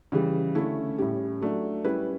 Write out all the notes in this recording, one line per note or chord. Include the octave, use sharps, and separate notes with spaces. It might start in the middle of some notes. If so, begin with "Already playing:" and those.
C#3 E3 G3
D3 A3 C#4 E4
A2 G3 C#4 G4
F#3 A3 D4
G3 C#4 E4 B4